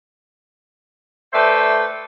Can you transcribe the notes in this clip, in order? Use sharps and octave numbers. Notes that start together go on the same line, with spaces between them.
A3 B4 C5 D5 E5 G5